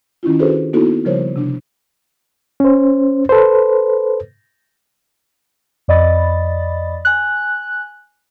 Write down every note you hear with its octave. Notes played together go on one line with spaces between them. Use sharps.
D#3 C#4 E4 F4
D4 F#4 G#4 A4 B4 C5
A#3 B3 D#4 E4 F#4 A4
C#3 F3 G3 A#4 C5 C#5
C3 D4
C#4 C5
A4 B4 C5
F2 D5 D#5 B5 A6
G#5 F#6